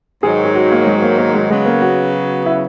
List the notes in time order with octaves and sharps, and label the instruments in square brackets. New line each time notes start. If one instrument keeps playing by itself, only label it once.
[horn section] G#2 D#3 F#3 [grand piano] G#4
[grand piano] G#4
F#4
A#3
G#3
A#3
A#3
G#3
[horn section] C#3 F#3 B3 [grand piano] G#3
[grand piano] A#3
F#4
E4